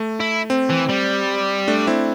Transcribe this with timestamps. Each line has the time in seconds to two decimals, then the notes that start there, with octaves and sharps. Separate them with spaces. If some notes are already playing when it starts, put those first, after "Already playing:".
Already playing: A3
0.20 E4
0.50 C4
0.70 E3
0.90 G3
1.68 A3 D4
1.87 C4 E4